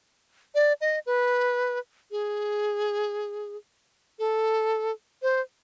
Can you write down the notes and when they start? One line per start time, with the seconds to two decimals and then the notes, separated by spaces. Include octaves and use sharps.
0.55 D5
0.81 D#5
1.06 B4
2.11 G#4
4.19 A4
5.22 C5